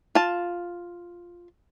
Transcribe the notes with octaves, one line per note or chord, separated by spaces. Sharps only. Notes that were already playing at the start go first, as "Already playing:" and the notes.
F4 A5